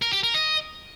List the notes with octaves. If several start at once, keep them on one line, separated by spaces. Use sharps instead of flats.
A#4
G4
A#4
D#5